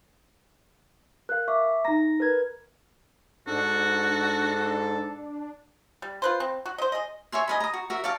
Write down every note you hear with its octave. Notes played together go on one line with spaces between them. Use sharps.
A#4 F5 F#6
E5 C#6 D6
D#4 A#5 A#6
A#4 B4 G#6
G#2 D4 F#4 A4
G3
F4 B4 C5
C4
F#4
C5 D#5
G#4 D#5
C#5 E5 G#5 C6
D#5 G#5 B5
A#5 D#6
F#4
F#4 A#4 E5
C#5 D5 F5 A5